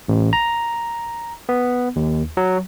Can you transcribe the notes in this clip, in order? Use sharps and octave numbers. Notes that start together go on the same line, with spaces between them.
A1
A#5
B3
D#2
F#3